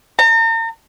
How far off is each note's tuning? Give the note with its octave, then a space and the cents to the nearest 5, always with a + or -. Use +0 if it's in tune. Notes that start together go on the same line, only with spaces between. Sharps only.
A#5 -40